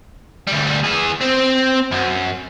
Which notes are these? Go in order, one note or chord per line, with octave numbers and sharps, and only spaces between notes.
D2 G3
E3 G#4
C4
F#2